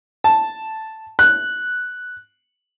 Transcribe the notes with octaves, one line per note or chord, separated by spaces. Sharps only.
A5
F#6